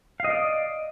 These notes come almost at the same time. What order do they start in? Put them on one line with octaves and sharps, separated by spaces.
F5 D#5 D5